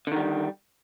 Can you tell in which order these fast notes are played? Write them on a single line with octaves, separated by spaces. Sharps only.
D3 D#3 G3